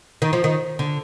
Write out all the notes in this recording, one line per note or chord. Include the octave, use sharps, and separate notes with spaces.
D#3
F3
D#3
D3